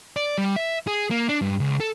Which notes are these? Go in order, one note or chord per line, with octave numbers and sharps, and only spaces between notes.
D5
G3
E5
G#4
A#3
D4
G2
C#2
A4